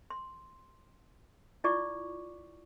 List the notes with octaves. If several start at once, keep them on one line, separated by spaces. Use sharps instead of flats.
C6
E4 F4 D5 C#6 D6